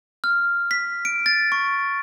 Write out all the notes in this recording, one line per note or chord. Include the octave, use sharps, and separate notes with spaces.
F6
B6
D7
A6
C#6